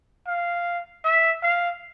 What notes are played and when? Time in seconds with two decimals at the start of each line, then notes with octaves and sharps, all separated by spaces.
0.27 F5
1.04 E5
1.43 F5